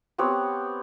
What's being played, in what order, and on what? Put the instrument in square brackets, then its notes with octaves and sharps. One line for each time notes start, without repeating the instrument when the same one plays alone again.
[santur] B3 C4 G4 C#5